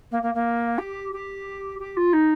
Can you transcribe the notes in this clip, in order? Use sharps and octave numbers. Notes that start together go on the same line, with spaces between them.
A#3
A#3
A#3
G4
G4
G4
F4
D#4